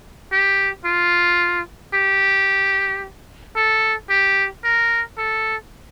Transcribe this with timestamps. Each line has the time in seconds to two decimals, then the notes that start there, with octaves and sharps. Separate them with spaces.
0.32 G4
0.85 F4
1.94 G4
3.56 A4
4.10 G4
4.64 A#4
5.18 A4